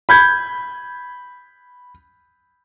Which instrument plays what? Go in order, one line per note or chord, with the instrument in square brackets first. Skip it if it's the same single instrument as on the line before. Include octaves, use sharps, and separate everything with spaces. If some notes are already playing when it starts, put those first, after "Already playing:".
[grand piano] B5 G6 G#6